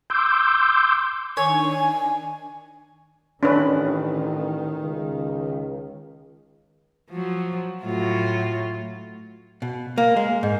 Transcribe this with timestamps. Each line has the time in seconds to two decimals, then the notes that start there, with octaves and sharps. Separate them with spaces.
0.10 C6 D6 E6 G6
1.37 D#3 D4 C#5 G#5
3.43 A1 D#3 C#4 D4 B4
4.82 C#2
7.10 F3 F#3
7.83 A2 F#3 F4
9.62 B2
9.98 A#3
10.16 G#3
10.43 G#2